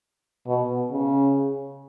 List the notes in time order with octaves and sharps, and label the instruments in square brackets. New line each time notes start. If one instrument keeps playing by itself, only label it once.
[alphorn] B2
C#3